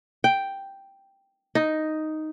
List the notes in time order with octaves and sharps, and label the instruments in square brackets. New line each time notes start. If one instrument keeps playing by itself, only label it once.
[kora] G5
D#4